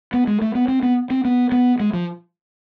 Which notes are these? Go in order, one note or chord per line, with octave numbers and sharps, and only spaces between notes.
B3
G#3
A3
B3
C4
B3
C4
B3
B3
G#3
F3